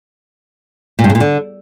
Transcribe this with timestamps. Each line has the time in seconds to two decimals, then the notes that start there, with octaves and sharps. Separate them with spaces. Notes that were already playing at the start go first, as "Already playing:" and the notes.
0.99 A#2
1.04 G2
1.10 C#3
1.15 A#2
1.20 D3